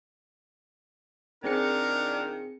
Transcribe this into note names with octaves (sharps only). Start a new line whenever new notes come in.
A#2 D#3 C4 D4 G#4 A#4 C#7